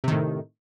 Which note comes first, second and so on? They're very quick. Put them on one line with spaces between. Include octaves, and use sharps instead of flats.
C3 D#3 A2